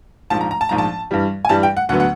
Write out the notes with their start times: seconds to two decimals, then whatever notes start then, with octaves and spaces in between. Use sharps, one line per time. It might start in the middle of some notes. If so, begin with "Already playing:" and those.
0.30 A#1 G#2 F3 A5
0.41 A#5
0.51 A#5
0.61 A5
0.69 A#1 G#2 F3 A#5
0.78 A5
1.11 G2 E3 G3
1.45 G#5
1.49 G2 E3 G3 A5
1.63 G5
1.77 F#5
1.89 D2 D3 F#3 B3 F#5
2.00 F#5